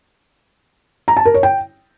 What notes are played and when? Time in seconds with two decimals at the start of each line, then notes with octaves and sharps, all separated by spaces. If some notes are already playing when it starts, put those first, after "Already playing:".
1.08 A#5
1.17 A5
1.25 A#4
1.34 C#5
1.43 G5